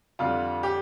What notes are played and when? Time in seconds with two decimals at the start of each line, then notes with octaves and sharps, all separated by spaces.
0.19 F2 D3 G3 F4
0.63 G4